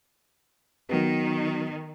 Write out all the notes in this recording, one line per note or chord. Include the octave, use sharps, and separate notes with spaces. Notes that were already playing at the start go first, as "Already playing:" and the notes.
D#3 F#3 B3 B4